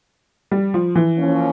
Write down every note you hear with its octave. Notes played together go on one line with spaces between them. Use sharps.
G3
F3
E3
F3 A#3 C#4